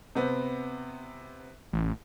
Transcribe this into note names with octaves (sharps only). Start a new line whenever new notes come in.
C3 B3 C4
A1